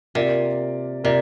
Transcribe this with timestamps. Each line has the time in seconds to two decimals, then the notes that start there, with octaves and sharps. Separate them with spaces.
0.15 C3 A#3 F4 A#4 D5
1.04 C3 A#3 F4 A#4 D5